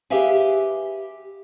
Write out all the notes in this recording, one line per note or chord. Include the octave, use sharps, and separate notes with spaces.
G4 G#4 B4 E5 F5 G#5